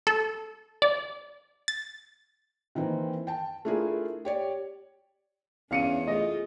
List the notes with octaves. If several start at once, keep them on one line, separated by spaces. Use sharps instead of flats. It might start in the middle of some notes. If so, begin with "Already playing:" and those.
A4
D5
A6
D#3 E3 A#3 C4
G5 A5
A3 D4 E4 F4 G#4 A#4
G4 C#5 D5
E2 C#4 D4 F5 C#7 D#7
A3 F4 G#4 D#5